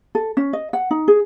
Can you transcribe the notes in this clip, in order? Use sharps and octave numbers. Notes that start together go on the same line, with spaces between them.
A4
C#4
D#5
F#5
D#4
G#4